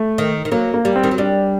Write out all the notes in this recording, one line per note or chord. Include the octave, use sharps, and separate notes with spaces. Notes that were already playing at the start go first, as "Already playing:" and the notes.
Already playing: A3
D#3
D#3
F#3 A#3
A#3
G3
C4
D#3
F#3
G3 D4